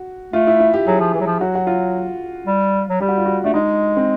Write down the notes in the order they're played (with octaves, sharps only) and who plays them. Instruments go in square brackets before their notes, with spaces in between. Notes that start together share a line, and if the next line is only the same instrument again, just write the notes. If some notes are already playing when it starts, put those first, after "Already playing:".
Already playing: [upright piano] F#4
[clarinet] A3 [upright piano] F4
[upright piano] E4
E4
G4
[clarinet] F#3 [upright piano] G#4
[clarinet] F3
E3
F#3
F3
[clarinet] F#3 [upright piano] F#4
[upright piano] F#4
F4
[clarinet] G3
F#3
[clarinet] G3 [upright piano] G4
[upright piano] F#4
F4
F#4
[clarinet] A3 [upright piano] D4
[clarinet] G#3 [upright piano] D#4
[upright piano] C4